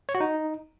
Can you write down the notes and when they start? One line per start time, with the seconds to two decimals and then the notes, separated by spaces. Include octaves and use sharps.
0.09 C#5
0.15 F#4
0.20 D#4